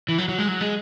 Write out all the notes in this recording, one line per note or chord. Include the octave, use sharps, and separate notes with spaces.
E3
F#3
F#3
G#3
F#3
G#3